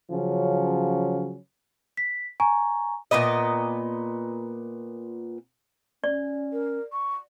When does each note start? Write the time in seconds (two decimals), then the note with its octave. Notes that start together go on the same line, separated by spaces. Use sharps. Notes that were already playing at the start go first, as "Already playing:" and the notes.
0.11 C#3 F3 F#3 C#4
1.97 B6
2.40 G#5 A#5 C#6
3.11 A#2 B3 B4 D#5
6.04 C#4 D5
6.53 A#4
6.92 C#6